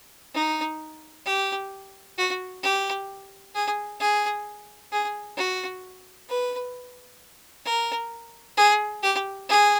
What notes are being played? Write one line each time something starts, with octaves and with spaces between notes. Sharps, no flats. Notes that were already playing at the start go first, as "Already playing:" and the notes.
D#4
G4
F#4
G4
G#4
G#4
G#4
F#4
B4
A#4
G#4
G4
G#4